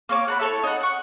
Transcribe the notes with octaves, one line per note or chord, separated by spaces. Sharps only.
A#3 C#5 D6
F#5 A#5 B5
E4 A4 C#5
D#4 F#5
F#5 C#6